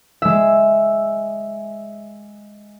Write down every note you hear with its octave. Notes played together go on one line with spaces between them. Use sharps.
G#3 E5